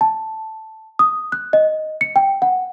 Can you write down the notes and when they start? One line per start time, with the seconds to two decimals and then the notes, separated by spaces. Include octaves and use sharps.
0.01 A5
0.99 D#6
1.32 F#6
1.53 D#5
2.01 C#7
2.16 G5
2.42 F#5